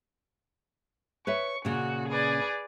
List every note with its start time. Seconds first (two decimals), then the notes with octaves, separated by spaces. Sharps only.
1.27 B4 C#5 E5 C#6
1.65 A#2 C#3 F#4
2.09 G#4 B4 D5